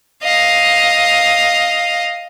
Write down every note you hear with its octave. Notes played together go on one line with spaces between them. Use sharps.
D#5 F5